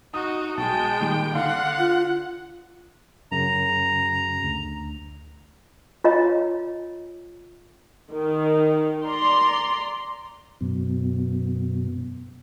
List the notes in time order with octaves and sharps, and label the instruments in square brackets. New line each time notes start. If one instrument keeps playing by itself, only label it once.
[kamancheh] D#4 F#4 [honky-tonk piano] D#6
[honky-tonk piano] B1 F#3 [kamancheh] G#3 G5 [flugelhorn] A5
[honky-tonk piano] A#2 D#3 G3
[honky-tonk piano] D3 [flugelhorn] F5 [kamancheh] F#5
[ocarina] F4
[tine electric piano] F#2 C#3 [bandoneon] A#5
[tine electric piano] D2
[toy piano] F4 C#5 D#5 A#5
[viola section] D#3
D5 A#5 C6
[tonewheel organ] F#2 B2